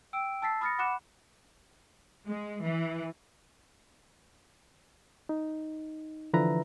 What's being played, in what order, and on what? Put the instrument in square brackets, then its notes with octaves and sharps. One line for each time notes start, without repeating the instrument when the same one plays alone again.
[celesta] G5 E6 D7
A5 E6 A6 B6 C7
B5 D#6 F6 A6 A#6 C#7
F#5 B5 D6 F#6 C#7 E7
[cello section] G#3
E3
[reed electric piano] D#4
D3 E3 F3 B4 E5 A#5